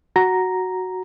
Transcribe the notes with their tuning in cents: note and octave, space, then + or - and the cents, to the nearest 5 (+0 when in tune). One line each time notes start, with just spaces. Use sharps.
F#4 +0 A#5 +0